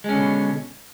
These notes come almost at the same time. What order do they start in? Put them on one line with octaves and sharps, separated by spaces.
G#3 C#4 D3 B2